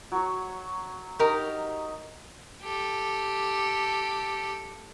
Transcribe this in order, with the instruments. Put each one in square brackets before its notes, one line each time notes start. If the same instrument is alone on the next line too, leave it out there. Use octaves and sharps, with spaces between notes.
[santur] F#3 C#5
[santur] D#4 [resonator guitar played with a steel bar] G4 A#4
[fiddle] G4 A4